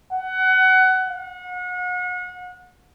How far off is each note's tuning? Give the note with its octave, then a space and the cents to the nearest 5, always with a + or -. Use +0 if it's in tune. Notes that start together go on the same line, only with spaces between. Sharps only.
F#5 +20
F#5 -35